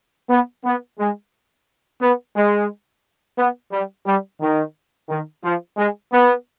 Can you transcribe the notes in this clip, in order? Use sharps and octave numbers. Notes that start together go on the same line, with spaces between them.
B3
B3
G#3
B3
G#3
B3
G3
G3
D#3
D#3
F3
G#3
B3